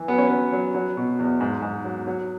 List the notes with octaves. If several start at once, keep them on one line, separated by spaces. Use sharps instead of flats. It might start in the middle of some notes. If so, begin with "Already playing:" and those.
Already playing: E3
F#3 B3
C#4
F#3 B3
F#3
F#3
B2
E2
G#2
G#2
F#3
F#3